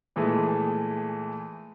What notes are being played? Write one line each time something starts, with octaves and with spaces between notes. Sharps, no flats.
A#2 E3 G#3 A3